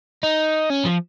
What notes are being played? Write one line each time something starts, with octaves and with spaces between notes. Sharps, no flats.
D#4
C#4
F3